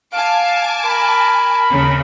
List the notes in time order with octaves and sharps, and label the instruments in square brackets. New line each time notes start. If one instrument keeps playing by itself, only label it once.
[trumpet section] F5 [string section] G#5 A5 D6
[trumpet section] A#4 B5
[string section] D#2 C#3